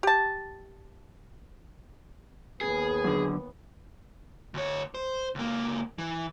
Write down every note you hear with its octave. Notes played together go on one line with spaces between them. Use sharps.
G4 A5
D#2 B3 G#4
F#2 D3
D2 C#5
C5
C#2 A#3
E3